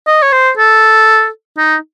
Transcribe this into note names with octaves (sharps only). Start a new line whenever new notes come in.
D#5
C#5
C5
A4
D#4